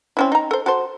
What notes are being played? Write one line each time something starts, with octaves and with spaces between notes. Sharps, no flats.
C4 C#4 E4
D#4 A#5
A4 C5
F#4 A4 C5